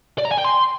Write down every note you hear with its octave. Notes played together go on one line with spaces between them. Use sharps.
D5
A#5
G#5
G5
C6